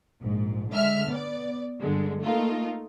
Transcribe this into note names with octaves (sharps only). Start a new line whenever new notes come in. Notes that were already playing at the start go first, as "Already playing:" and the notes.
A#1 G#2
D3 G#3 E5 F6
B3 D5
G2 D3 G#3
A3 A#3 D#4 F4 A#4